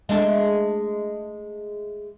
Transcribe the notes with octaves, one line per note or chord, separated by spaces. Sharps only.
G#3 A3 D4